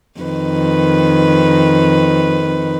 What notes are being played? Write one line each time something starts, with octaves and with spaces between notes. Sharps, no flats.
F2 D#3 B4